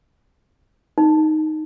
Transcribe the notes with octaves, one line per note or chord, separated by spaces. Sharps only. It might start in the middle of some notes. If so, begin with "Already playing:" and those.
D#4